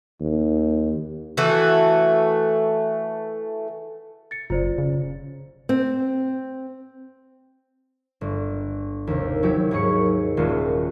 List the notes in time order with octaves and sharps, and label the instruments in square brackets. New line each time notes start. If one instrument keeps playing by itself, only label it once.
[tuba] D#2
[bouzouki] E3 A3 F#4
[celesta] A6 C#7
[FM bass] F#1 [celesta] F4 C5 D5
[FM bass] C#3
[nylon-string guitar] C4
[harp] G1
D#2 C3
F#3 E4 G4
D#2 G#2 G#4 C#6 C#7
D#1 G#3 F4 F#4